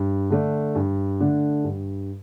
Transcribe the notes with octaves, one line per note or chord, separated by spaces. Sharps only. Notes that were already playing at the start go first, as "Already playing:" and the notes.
Already playing: G2
D3 A3 D4
G2
D3 A3 D4
G2